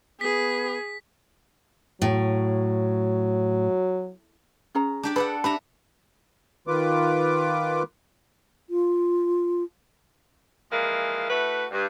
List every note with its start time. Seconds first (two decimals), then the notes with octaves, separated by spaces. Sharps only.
0.21 B3 G#4 B6
2.02 A2 F#3
4.75 C#4 G#4 A#5
5.03 D4 G4 D5
5.16 G#4 A4 B4 D5 F#5 B5
5.44 D4 G4 B4 E5 A#5 B5
6.67 D#3 F4 B4 D6
8.70 F4
10.70 E3 F3 G#3 A#3
11.29 A3 E4 F#4 B4
11.71 G2